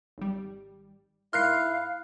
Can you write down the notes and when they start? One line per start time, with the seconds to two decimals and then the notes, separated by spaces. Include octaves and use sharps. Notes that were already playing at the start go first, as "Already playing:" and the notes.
0.18 G#1 G3
1.33 G#2 E4 A#4 F5 C6 F6 F#6 C7